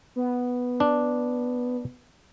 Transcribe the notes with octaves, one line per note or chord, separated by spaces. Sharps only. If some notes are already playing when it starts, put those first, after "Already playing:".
B3
D4